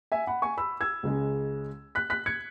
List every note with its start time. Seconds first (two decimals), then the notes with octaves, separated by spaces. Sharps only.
0.12 E5 G#5
0.27 F#5 B5
0.42 G#5 C#6
0.58 B5 E6
0.81 E6 G#6
1.03 C#2 C#3 G#3
1.95 F#6 B6
2.10 F#6 B6
2.26 G#6 C#7